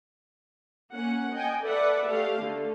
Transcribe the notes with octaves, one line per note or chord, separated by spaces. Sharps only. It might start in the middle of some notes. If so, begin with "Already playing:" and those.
A#3 C#4 F#5
D#5 G5 G#5
A4 B4 D5 E5 F#5
A3 G4 F5
D3 A3